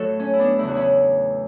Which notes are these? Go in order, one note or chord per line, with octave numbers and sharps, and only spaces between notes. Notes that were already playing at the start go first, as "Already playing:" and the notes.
Already playing: A2 F#3 A3 F#4 A4
C#4
E4
B3 D4
E2 C#3 F#3 A3 E4
F#4
C#4 E4